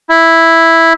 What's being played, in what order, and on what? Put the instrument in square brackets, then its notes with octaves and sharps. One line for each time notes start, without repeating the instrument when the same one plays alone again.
[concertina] E4